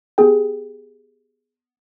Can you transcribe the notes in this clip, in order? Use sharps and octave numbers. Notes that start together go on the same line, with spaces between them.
B3 G4 G#4 G5